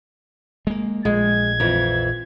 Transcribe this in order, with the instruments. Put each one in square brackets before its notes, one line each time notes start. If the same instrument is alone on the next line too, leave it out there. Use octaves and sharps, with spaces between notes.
[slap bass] G#3 A#3
[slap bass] A#1 [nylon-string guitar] G#3 [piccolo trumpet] G#6
[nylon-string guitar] F2 E3